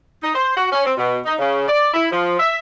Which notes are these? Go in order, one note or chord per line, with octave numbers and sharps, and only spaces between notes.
D#4
C5
F#4
C#4
C4
B2
D#4
C#3
D5
E4
F3
E5